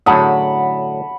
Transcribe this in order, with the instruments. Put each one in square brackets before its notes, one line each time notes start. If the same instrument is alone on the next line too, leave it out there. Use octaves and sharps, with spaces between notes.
[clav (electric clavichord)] A2 D3 F#3 [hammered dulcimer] F#5 B5 D6 [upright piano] A5 D#6